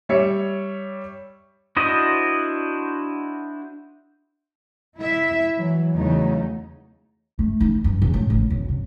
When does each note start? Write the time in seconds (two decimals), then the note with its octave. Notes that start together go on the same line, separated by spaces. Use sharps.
0.09 G3 C#5 E5 C#7
1.77 D4 E4 F#4 C5 D#5
4.97 E4 E5
5.55 E3 F#3
5.94 E2 C#3 F#3 A3 D#4
7.39 A3
7.60 D#4
7.84 G2
8.02 E1
8.14 A2
8.30 A1
8.50 B1
8.69 C3